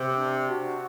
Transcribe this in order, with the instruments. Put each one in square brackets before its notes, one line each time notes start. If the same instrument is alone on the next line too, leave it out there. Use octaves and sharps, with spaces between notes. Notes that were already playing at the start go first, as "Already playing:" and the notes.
Already playing: [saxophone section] C3
[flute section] D4
F#4